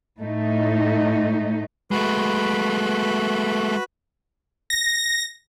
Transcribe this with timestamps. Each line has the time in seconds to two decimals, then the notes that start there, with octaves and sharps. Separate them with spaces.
0.20 A2 A3 D#4
1.91 G#3 A3 F#4 B4 B5
4.70 A#6